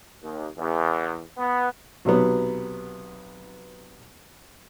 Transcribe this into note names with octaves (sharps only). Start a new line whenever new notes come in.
D#2
E2
B3
B1 C3 F#3 B3